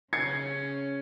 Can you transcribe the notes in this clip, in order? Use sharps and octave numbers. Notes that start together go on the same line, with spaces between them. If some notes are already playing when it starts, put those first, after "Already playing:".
C#3 C#4 G#6 C7 C#7